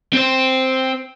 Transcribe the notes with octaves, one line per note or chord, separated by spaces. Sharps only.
C4 C5